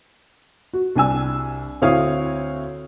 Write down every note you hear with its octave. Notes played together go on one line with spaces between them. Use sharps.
F#4
C2 D4 G#5 E6
D2 C4 E4 C#5 F5 D#6